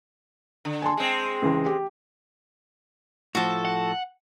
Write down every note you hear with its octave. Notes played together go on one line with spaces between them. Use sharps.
D3
G#5 A5 C6
G#3 C4
C#2 E3
G4
A2 F3 F#4 A4
F#5